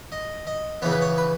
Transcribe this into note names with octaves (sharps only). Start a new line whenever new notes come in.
D#5
D#5
C#3 E3 B3 C#5
B4
C#5
B4